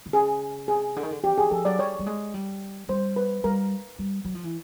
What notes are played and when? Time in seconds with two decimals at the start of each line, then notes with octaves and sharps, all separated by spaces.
0.06 D3
0.13 C#3 G#4
0.68 C3 G#4
0.96 D3
1.03 D#3
1.11 D3
1.23 E3 G4
1.38 E3 G#4
1.51 F3 A4
1.65 F#3 D5
1.79 G3 C#5
1.99 G3
2.06 G#3
2.34 G3
2.89 G3 C5
3.16 B4
3.44 G3 A#4
3.99 G3
4.25 F#3
4.35 F3
4.44 E3